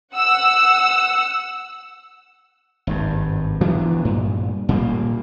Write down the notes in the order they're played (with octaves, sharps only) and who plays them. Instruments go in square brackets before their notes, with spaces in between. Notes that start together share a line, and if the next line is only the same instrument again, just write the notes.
[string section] F#5 E6
[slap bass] G#1 G2
E3 F#3 B3 D4
G2 A#2
A#2 G3 A#3